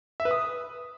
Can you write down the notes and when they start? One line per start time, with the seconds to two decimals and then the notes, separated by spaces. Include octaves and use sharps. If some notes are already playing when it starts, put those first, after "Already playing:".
0.20 E5
0.25 B4
0.31 D#6